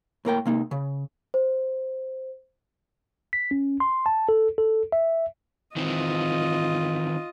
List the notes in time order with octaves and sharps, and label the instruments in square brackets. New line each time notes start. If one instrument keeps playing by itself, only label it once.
[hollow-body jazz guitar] A2 A#3 A#4 G5
C3 A#3 D#4
C#3
[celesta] C5
[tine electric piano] B6
C#4
C6
A5
A4
A4
E5
[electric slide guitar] D#3 E3 C4 [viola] F4 D#5